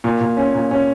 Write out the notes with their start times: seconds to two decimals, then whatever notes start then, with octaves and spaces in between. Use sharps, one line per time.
0.04 A#2
0.21 A#2
0.37 C#4
0.54 A#2
0.71 C#4